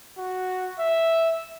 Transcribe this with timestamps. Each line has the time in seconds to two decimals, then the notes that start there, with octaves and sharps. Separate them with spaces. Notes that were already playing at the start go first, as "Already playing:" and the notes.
0.18 F#4
0.80 E5